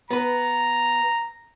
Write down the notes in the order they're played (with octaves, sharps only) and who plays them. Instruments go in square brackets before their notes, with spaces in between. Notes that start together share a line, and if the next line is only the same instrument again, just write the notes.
[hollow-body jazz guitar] B3 B4 [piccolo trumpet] A#5